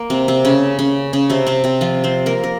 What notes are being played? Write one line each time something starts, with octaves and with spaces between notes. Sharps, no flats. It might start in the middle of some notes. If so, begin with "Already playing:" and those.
Already playing: A#3
C3 C4
C3 C4
C#3 C#4
C#3 C#4
C#3 C#4
C3 C4
C3 C4
C3 C4
F3 F4
C4 C5
A#3 A#4
A#4